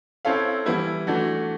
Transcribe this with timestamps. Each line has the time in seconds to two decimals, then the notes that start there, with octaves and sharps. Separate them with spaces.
0.25 C4 E4 A4 C#5 F5
0.66 E3 G3 B3 E4
1.07 E3 A3 D4 F#4